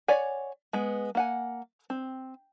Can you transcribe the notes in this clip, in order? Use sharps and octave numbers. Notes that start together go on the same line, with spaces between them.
C#5 D5 F#5 G#5
G#3 B3
A#3 F#5 G#5
C4